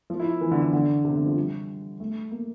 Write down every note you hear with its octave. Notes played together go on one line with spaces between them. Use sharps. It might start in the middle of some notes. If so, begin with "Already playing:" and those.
F3
E4
E3
D3
D3
D3
C3
D3
F3
G3
A3
A#3